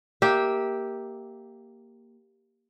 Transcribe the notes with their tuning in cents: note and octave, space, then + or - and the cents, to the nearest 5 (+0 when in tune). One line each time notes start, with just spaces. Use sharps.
A#3 +0 G4 +0 E5 -20